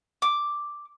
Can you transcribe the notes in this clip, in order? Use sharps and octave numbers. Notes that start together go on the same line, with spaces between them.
D6